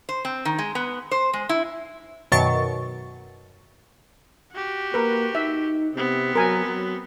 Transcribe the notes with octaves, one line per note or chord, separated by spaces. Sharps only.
C5
C4
D#3
G#3
B3
C5
G#3
E4
F#2 B2 D#3 C#6 A6
F#4 G4
A#3 A#4 B4
D#4 E5
C3 B3 C4
F#3 A#4 G#5
F#3